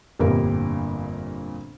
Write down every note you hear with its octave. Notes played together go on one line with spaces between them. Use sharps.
G1 F2 A#2 D3 G3 A#4